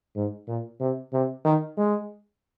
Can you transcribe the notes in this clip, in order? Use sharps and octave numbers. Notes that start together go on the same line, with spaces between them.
G#2
A#2
C3
C3
D#3
G#3